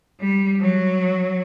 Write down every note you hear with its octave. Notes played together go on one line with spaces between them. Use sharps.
G3
F#3